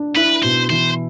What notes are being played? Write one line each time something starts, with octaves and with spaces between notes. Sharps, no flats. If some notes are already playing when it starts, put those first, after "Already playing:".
Already playing: D4
E4 B4
B2 C5
E3 C5